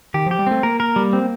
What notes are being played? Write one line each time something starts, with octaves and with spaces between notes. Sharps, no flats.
D#3 G4
F3 G4
G3
A3 C4
A#3 A#4
A#4
G3
C4